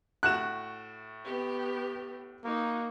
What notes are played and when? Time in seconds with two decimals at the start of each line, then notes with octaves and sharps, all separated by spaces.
0.23 A2 F#4 F#6 E7
1.24 B3 G4
2.44 A#3 D#4 F#4